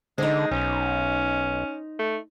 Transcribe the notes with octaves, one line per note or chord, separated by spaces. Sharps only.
D3 G#3 D#4 C5
B1 C#4
A3